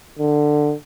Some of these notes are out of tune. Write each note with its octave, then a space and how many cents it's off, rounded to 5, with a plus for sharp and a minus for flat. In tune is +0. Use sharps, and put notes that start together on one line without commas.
D3 +15